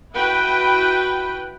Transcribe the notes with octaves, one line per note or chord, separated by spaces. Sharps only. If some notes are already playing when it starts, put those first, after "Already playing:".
E4 F#4 B4 G5